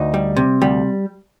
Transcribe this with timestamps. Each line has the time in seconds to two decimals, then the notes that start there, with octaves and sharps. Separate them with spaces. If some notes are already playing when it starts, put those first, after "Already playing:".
Already playing: D2 D#4
0.14 G3
0.36 C3
0.61 D2 G3